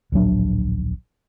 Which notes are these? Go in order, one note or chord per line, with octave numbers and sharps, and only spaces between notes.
D1 A#1 F#3 D4